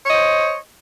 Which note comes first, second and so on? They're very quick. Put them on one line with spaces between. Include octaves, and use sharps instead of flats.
C#5 D#5 C5